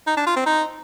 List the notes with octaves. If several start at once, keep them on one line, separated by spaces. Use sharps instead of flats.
D#4
D4
F4
C4
D#4